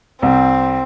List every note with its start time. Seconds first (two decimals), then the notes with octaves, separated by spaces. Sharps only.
0.22 C2 C4